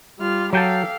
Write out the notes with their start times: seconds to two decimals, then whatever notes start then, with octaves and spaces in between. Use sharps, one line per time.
0.18 G3 F4 F6
0.53 F#3 G4 A4 F5 G5 A5